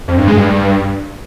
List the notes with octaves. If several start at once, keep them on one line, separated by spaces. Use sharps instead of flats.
F2
G2
G#3
G2